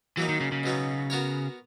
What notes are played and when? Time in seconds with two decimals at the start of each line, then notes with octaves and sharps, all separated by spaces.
0.17 E3 F#3 A#3 D#4
0.29 D#3
0.40 C#3
0.52 C#3
0.63 B2 F#3 B3 D#4
1.10 B3 F#4 A#4 C#5